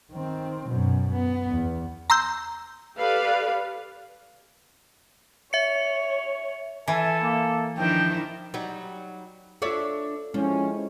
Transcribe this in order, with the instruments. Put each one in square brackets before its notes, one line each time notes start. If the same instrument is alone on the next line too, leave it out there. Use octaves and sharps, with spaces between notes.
[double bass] D#3 C4
F#2 B2
B3
E2
[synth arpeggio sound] A#5 C6 E6 G6
[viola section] G4 A4 B4 D5 F5
[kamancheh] C#5 [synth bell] E5 C#7
[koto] E3 [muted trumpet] A4 [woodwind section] G#5
[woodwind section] A#3
[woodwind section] G2 F3 [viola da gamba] D#3 D4 E4 [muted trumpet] G5
[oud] F#3 G3 D#4
[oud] D4 C#5 E5 [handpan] F4 A4
[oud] F3 [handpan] G#3 C4 E4 [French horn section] C#4